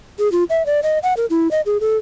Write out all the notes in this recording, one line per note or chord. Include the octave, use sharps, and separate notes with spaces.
G#4
F4
E5
D5
D#5
F#5
A#4
E4
D#5
G#4
A4